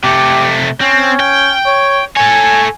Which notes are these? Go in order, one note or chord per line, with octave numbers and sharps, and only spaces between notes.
C3 A3 G4
C4 C#4
G5
C#5
A4 C#5 G#5